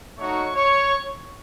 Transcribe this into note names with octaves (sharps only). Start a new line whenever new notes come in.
A3 D#4 F#4 C#5 C#6
C#5 C#6